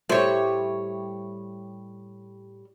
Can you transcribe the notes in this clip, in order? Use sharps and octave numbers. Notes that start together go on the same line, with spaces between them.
A2 G3 C5 C#5 E5